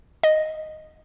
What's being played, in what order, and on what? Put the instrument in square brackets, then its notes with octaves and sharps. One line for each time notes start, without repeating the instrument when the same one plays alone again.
[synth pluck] D#5